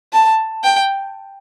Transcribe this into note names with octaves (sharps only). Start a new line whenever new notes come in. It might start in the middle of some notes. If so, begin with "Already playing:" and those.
A5
G5